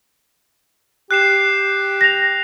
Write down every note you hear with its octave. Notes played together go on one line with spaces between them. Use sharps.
G4 F#6 C7 E7
A#6 F7